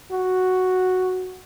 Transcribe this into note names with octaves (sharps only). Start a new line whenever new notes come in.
F#4